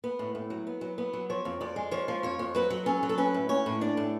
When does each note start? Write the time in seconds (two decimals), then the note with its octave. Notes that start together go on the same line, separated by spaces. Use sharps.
0.04 B3
0.19 A2
0.35 A2
0.50 F#3
0.67 B3
0.81 F#3
0.98 B3
1.13 F#3
1.30 F3 C#5
1.45 F2
1.61 F2 D5
1.76 G#3
1.91 F3 C#5
2.08 F3
2.23 F2 C#5
2.39 F2
2.55 F#3 B4
2.70 F#3
2.86 C#4 A4
3.03 F#3
3.09 A4
3.18 C#4 B4
3.34 A2
3.49 C#4 C#5
3.66 A2
3.81 D4 D5
3.97 A2